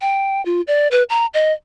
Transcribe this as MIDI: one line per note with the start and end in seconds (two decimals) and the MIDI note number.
0.01 0.43 79
0.45 0.61 65
0.67 0.88 74
0.91 1.03 71
1.10 1.26 82
1.34 1.52 75